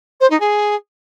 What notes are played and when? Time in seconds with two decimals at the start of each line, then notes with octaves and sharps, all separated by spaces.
0.20 C5
0.30 D#4
0.40 G#4